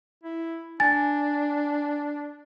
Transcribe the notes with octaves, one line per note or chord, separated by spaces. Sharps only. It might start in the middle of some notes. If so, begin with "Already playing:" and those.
E4
D4 G#5 A6